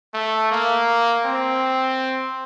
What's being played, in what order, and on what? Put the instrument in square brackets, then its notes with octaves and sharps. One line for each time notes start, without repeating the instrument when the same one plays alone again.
[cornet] A3
A#3
C4